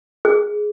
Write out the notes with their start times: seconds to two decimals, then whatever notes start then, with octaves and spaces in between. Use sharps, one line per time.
0.25 G#4